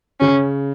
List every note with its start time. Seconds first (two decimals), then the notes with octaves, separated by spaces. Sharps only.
0.20 C#3 C#4